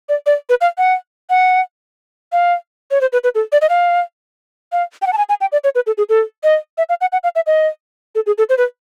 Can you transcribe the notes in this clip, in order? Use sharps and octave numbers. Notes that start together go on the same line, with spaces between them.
D5
D5
B4
F5
F#5
F#5
F5
C#5
C5
B4
B4
A4
D5
D#5
F5
F5
G5
F#5
A5
G#5
G#5
G5
D5
C#5
B4
A4
G#4
A4
D#5
E5
F5
F#5
F#5
F5
E5
D#5
A4
G#4
A4
C5
B4